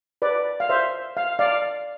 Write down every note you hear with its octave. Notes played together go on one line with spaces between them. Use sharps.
B4 D5
F5
C5 E5
F5
D5 F5